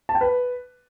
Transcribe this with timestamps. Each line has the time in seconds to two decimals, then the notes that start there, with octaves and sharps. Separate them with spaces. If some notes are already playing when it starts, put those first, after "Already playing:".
0.09 A5
0.15 G5
0.21 B4